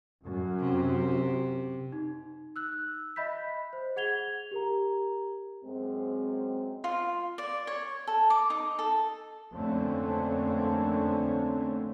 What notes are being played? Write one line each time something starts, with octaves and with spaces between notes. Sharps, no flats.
F#2
C3
D#4
E6 F#6
D#5 E5 B5 G6 B6
C5
G#4 F#5 G#6 F7 G7
G4 A#4 A#5
F#2 G#3 C4
F4
D5
C#5
A4
D6
D#4
A4
F2 D3 A3 A#3 C4 C#4